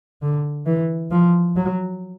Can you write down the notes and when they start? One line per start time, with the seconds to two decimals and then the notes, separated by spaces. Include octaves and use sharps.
0.22 D3
0.66 E3
1.11 F3
1.56 F#3